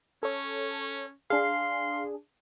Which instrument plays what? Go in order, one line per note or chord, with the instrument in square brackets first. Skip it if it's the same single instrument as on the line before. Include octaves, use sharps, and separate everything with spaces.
[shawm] C#4 [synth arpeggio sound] A4 C#5
[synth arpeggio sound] D4 G#4 [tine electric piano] F5 [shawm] C6